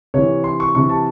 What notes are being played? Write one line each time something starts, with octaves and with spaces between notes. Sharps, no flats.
C3 E3 C#5
C6
C#6
C3 E3 C#6
A5